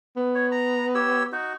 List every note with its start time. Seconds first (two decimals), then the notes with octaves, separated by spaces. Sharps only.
0.17 B3
0.35 C#5
0.52 A#5
0.95 G4 C#5 E6
1.32 D#4 F#4